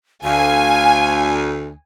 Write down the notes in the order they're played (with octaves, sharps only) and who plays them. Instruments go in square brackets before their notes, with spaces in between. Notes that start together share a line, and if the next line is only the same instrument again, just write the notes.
[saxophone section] D2 [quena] F5 [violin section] G#5